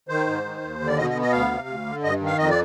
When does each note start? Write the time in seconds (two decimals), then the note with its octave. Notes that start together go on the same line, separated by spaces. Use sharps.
0.09 D#3 C5
0.27 G#2
0.44 D#3
0.62 D#2
0.80 D3
0.87 D5
0.98 B2 D#5
1.10 D#5
1.15 B3
1.22 D#5
1.32 D2 F5
1.51 C3
1.68 D2
1.86 D3
2.03 G2 D#5
2.20 D#3
2.27 F5
2.38 F2 D#5
2.50 D5